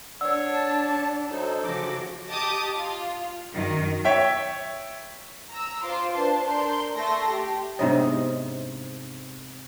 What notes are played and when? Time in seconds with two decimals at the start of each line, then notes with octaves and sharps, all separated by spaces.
0.21 D4 C#5 D5 F#5 E6
0.53 A5
1.30 F#3 D#4 A4 C5
1.64 C#3 F3 F#4 D6
2.29 G4 D#5 A5 D6 D#6
2.74 F4
3.53 F#2 D#3
4.05 C#5 E5 G5
5.51 A#5 E6
5.85 F4 C5 C6 D6
6.13 D4 B4 C5 A5 C6
6.45 A#4 D5 C6 G6
6.96 A3 A4 C6 A#6
7.30 G4
7.79 G#2 C3 B3 D4 C#5 D#5